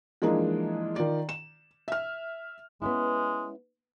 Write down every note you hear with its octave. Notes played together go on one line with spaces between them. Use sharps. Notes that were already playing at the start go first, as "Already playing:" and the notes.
E3 F3 G#3 A#3 D4 D#4
D#3 F4 D5
E7
E5 F6
G#3 B3 C#4 E4